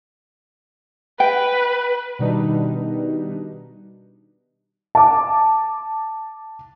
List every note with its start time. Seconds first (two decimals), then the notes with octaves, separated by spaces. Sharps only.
1.20 B4 G5
2.19 B2 D#3 G3 D4 D#4 B4
4.95 A5 D6